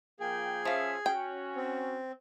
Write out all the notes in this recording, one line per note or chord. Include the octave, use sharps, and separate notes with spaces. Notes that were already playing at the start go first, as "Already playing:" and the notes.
F3 A#3 G#4 G5
F3 C#4 E5 F5
C#4 F#4 G5
C4